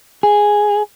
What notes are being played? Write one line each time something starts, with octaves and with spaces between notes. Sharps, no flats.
G#4